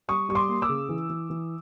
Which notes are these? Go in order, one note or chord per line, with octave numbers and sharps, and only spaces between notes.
G3 C#6 D#6
G3 C#6
C6 D6
A#3
D6 E6
C#3
E3
E3
E3